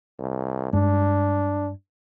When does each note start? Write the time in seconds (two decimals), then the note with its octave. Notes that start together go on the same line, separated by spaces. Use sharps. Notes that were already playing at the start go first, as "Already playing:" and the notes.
0.19 C2
0.73 G2 G#3 D4